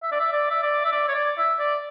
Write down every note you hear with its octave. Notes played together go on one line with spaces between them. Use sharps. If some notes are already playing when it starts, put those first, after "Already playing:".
E5
D5
E5
D5
E5
D5
E5
D5
C#5
D5
E5
D5